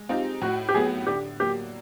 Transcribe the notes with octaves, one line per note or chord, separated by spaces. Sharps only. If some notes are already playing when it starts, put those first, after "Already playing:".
Already playing: G#3
C4 D#4 F4 G4
A2 F#4
G4
F#3 B3 G#4
D3 G4
F#3 A#3 G4